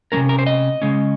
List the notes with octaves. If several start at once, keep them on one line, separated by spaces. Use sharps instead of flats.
G3 C#4 A#4
C3
A#4
C5
D#5
C#3 G#3 C#4